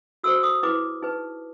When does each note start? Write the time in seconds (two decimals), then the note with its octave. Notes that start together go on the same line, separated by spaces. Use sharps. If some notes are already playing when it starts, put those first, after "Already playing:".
0.24 F#4 A4 C5 E6
0.43 D#6
0.63 E4 G#4 B4 D6
1.02 D#4 G#4 B4